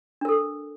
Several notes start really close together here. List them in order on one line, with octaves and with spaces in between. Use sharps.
D4 A#4 A4